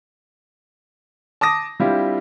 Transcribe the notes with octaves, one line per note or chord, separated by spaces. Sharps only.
A5 D6 D#6 A#6
G3 C4 D4 E4 F4 G4